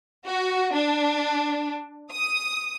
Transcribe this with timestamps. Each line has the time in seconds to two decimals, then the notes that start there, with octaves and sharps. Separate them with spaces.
0.25 F#4
0.73 D4
2.11 D#6